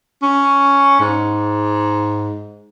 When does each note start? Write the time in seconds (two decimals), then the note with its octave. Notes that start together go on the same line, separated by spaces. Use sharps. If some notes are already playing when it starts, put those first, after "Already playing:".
0.22 C#4
1.00 G#2